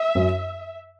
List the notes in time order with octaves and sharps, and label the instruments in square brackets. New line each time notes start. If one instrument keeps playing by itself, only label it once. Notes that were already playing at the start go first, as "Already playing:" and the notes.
Already playing: [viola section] E5
[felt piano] F#2